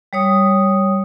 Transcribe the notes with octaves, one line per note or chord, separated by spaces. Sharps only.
G3 C#5 D#6